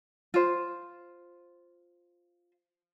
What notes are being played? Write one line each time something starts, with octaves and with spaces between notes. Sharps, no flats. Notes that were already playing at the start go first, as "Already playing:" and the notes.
F4 C5